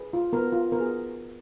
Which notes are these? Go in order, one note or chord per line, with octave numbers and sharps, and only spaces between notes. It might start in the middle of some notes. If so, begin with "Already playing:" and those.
Already playing: G#4 B4
F4
B3 A#4
F4
B3 A#4
G#4